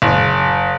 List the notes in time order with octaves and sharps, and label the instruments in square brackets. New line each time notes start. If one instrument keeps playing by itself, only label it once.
[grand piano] F#1